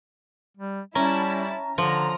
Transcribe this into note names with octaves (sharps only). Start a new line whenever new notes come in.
G3
G3 C#4 E4 A5 A#5
D3 F3 A#5